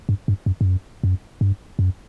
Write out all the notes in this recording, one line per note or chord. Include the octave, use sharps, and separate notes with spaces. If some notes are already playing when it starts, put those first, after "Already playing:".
G2
G2
F#2
G2
F#2
F#2
G2
F#2